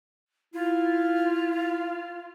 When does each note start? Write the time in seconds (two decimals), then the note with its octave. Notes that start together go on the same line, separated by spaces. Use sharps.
0.54 E4 F4